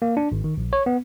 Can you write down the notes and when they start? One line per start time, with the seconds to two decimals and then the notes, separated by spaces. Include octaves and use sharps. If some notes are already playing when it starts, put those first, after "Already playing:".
0.02 A#3
0.17 D4
0.32 G#1
0.44 D#3
0.57 A#1
0.73 C#5
0.86 B3